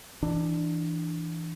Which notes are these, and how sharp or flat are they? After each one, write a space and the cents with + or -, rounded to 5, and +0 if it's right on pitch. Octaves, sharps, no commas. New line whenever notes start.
E3 +0 D4 +15